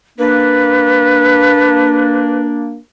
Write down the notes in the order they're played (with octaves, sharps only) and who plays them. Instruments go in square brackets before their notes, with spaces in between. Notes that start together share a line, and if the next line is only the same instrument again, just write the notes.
[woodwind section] A#3 D4 [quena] B4